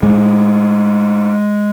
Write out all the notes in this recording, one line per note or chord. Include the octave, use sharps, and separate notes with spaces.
A2 G#3